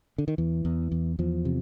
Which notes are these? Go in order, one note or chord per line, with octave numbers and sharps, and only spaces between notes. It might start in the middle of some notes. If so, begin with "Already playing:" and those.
D3
D#3
E2 E3
E2
E2
E2 F3
C3